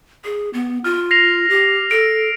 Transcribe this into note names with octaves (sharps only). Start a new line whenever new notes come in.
G#4
B3
F4 F6
A#6 C7 F7
G4
A4 D7